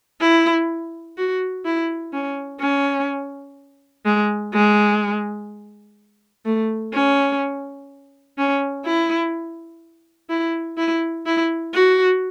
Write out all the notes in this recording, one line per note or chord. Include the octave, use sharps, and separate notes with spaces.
E4
F#4
E4
C#4
C#4
G#3
G#3
A3
C#4
C#4
E4
E4
E4
E4
F#4